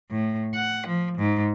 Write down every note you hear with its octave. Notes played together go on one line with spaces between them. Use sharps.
A2
F#5
F3
G#2